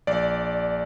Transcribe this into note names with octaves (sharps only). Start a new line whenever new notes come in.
A#1 D5